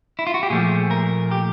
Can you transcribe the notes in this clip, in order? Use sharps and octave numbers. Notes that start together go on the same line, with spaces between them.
E4
F4
F#4
G4
A#2 F3 A3 G#4
A#4
G4